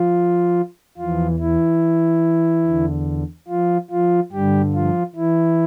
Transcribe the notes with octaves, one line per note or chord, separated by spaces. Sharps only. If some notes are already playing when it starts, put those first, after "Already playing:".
Already playing: F3 F4
E2 E3 F3 F4
E3 E4
E2 D3
F3 F4
F3 F4
G2 D3 G3 G4
F3 F4
E3 E4